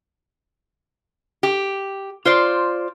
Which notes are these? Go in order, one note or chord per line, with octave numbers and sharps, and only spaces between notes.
G4
F4 C5 D5